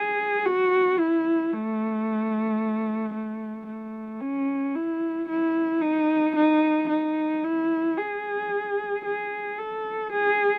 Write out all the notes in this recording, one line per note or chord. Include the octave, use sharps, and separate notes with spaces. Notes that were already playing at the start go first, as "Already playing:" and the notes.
Already playing: G#4
F#4
E4
A3
A3
A3
C#4
E4
E4
D#4
D#4
D#4
E4
G#4
G#4
A4
G#4